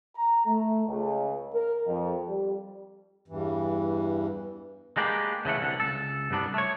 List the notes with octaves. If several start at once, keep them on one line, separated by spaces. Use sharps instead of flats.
A#5
A3
C#2
A#4
F2
G3
E2 G2 E3
G#3 A#3 B3 D4 G4
C#3 E3 A3 F#5
C2 D3
C#2 A4
C2 G2 B3 D4
A3 C#5